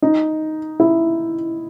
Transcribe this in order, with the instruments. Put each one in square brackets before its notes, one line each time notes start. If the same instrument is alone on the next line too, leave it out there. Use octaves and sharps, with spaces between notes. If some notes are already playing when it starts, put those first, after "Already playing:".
[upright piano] D#4
E4